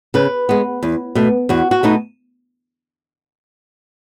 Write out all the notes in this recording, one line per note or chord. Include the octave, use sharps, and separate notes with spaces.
C#3 B4
G#3 B3
E2
B2 A3
E2 F#4
F#4
B2 A3 D#4